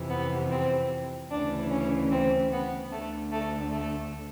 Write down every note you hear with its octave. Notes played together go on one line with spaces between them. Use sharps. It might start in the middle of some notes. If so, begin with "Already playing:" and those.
Already playing: F2 C3 E3
B3
C4
D2 C#3 E3 D4
C#4
C4
B3
D2 D3 A3
A3
A3